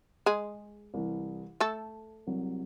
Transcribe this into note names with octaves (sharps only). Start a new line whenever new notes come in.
G#3 G#4
C2 C3 E3
A3 A4
C2 C3 F#3